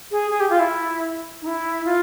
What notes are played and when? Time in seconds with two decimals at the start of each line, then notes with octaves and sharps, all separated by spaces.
0.11 G#4
0.31 G#4
0.40 G4
0.50 F4
0.60 E4
1.42 D#4
1.47 E4
1.85 F4